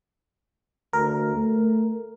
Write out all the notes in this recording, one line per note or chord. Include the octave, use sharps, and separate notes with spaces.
D2 A#4
A3